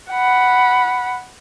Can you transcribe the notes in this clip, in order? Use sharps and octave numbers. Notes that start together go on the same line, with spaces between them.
F#5 B5